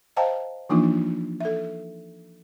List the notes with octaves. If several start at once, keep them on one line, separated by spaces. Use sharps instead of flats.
C5 D#5 F5 G5 A5 A#5
E3 F3 A#3 D4 D#4 F4
A4 E5